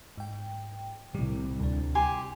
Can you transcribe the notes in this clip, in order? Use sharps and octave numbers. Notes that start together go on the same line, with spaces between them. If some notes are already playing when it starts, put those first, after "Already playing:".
G#2 G5
C2 A2 D#3 G3
D2 D4
G4 G#5 C6